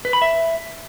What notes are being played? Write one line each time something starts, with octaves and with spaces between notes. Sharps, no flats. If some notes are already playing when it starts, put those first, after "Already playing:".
B4
B5
E5